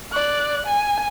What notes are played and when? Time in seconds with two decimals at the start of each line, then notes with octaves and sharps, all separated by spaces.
0.13 D5 F#6
0.67 G#5